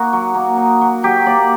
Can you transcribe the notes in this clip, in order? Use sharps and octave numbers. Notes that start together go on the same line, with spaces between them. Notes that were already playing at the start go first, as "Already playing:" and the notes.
Already playing: A#3 D#4 F#4
F#3
A#3
D#4
F#3
F#3 G4
A#3 D5